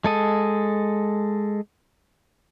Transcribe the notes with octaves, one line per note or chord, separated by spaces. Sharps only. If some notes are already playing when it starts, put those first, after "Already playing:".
G#3 A4 D#5